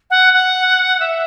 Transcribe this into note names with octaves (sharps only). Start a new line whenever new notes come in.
F#5
F#5
E5